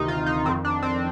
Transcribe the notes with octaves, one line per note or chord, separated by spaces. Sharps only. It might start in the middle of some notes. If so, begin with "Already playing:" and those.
Already playing: D2 C3 D#3 D#4
F4
D#4
F2 D#3 C4
D4
C4